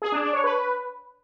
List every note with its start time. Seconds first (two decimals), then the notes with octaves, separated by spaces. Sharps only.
0.02 G#4
0.12 D4
0.23 D4
0.33 C#5
0.44 B4